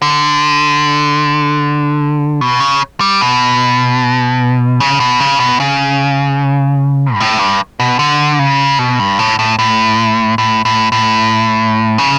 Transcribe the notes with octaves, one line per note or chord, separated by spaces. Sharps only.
D3
B2
C#3
G3
B2
C#3
B2
C#3
B2
C#3
G2
A2
G2
B2
D3
C#3
B2
G2
A2
A2
A2
A2
A2
A2
C#3